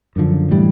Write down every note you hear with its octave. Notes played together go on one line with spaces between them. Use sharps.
F#2 D3 F3
A2 E3 G3